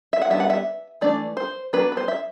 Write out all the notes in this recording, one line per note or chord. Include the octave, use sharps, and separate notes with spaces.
E5
F#5
G3 B3 D4 E5
F#5
E5
E3 A3 D4 D5
C5
F#3 B3 D4 B4
B4
C5
E5